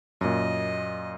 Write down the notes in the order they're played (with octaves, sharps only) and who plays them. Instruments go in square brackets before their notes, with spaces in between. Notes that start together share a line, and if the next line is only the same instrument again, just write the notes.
[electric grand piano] F#2 A#2 [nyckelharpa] D#5